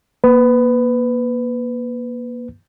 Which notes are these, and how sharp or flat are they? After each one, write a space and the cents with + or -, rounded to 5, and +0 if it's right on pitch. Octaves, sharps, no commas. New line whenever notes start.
A#3 +30 B4 +15